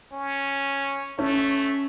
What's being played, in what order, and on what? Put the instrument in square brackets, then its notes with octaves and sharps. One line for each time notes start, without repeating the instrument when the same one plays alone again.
[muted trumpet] C#4
[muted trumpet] A3 [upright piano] C#4